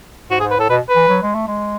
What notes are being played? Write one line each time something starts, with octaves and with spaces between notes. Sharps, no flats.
G#2 F#4
G#4
G#2
B4
A2 A4
B2 B4
B4
E3
F#3
G#3
A3
G#3